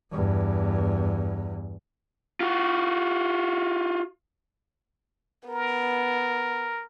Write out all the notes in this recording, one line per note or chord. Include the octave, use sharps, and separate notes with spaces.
E2 G2
F4 F#4
B3 A#4